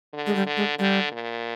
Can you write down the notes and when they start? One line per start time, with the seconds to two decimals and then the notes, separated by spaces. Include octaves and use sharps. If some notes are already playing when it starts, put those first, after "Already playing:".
0.13 D3
0.26 G#3
0.36 G3
0.46 D3
0.57 G#3
0.79 D3 G3
1.12 A#2